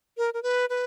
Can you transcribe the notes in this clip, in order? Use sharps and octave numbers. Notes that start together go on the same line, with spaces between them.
A#4
A#4
B4
B4